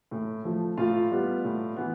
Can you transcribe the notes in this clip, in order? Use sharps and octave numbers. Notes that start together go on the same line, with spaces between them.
A2
F3 A3
A2 F4 F5
G3 B3
A2
E3 B3